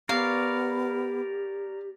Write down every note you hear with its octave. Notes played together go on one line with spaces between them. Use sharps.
B3 G4 A#4 C#5 D5 F5